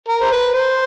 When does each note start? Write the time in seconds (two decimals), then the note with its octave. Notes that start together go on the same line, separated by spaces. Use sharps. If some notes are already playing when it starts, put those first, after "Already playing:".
0.09 A#4
0.21 C5
0.31 B4
0.54 C5